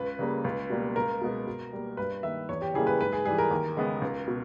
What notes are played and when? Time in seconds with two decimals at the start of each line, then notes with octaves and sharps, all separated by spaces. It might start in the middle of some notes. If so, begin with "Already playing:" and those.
Already playing: C#2 B4
0.19 C#3 G3 A#3
0.44 C#2
0.70 B2 G3 A#3
0.96 C#2 A#4
1.21 B2 G#3 B3
1.47 B2
1.73 G3 A#3
1.97 G2 B4
2.23 D#3 A#3 E5
2.49 E2 C#5
2.62 G4
2.74 C#3 E3 G3 A#3 G#4
2.87 B4
3.00 G#2 B4
3.13 G#4
3.25 E3 G3 G#4
3.38 A#4
3.51 D#2
3.77 C#3 G#3 B3
4.02 C#2
4.27 B2